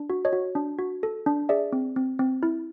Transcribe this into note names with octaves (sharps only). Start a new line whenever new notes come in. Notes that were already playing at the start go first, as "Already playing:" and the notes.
Already playing: D4
F#4
C#5 D#5
F#4
D4
F#4
A4
D4
G#4 D5 E5
C4
C4
C4
E4